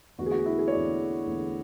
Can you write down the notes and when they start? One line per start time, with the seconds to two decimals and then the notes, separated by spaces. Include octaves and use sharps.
0.18 E2 D3 A3 F#4
0.26 G#4
0.31 F#4
0.46 E4
0.59 G#4
0.68 C#5
0.72 E2 D3 A3 D5
1.26 E2 D3 A3